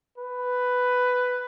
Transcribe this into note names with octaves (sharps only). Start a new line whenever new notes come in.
B4